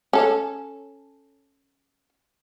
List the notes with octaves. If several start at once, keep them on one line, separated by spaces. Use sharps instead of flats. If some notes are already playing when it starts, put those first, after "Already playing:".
C#4 A4